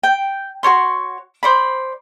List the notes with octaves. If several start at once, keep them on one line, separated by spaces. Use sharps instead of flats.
G5
F#4 A#4 C#5 C6
C5 D5 B5